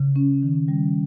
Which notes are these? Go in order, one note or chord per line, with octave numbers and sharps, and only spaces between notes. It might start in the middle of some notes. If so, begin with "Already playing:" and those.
Already playing: C#3
C#4
D#3
G3